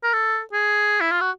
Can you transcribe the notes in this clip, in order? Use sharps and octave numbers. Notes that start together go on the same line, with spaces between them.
A#4
A4
G#4
E4
F4
F#4